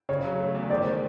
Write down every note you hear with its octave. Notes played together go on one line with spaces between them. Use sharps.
C#3 C#5
F#3
A3
E2
D#3 C5 D5
G#3